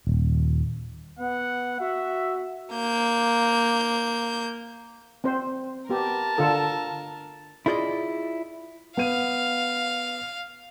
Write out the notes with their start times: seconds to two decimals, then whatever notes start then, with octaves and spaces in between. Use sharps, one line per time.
0.07 D#1
1.19 B3 F#5
1.80 F#4 E5
2.75 A#3 G6
5.24 C4 C5
5.89 B3 G4 A#4 A5
6.38 D3 F4 A4
7.66 E4 F4 G#4 C5 D5 D#5
8.97 B3 F5 D#7